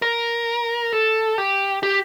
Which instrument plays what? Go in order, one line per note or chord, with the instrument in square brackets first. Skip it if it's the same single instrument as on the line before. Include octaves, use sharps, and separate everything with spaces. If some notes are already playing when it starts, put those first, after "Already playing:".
[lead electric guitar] A#4
A4
G4
G4